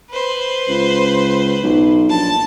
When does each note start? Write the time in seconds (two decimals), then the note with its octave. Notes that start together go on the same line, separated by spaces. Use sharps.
0.11 B4 C5
0.69 C#2
1.63 B1
2.09 A#1 A5